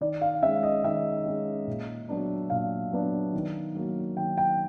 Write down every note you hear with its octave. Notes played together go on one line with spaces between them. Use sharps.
D#3 D5
F5
G#3 C#4 E5
D#5
D#3 E5
G#3 C#4
A#2
F#3 B3 D4
A#2 F5
F#3 B3 D4
D#3
F#3 A#3
D#3 G5
G5